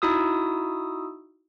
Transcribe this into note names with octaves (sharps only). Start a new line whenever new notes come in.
D#4 E4 F#4 D#6 E6